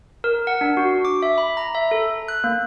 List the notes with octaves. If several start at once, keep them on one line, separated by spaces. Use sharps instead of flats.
A#4
F#5
D4
F#4
D6
E5
B5
A#5
E5
A4
F#6
A#3